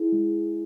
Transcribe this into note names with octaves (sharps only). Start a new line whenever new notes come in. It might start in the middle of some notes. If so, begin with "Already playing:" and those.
Already playing: E4 G#4
G#3